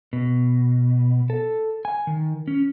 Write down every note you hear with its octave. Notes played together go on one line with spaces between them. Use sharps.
B2
A4
G#5
D#3
C#4